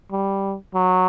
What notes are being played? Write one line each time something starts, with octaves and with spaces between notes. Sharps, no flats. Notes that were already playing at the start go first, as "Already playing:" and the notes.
G3
F#3